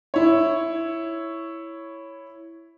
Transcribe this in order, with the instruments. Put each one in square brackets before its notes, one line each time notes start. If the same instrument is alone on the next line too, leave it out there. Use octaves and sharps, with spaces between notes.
[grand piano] E4 C#5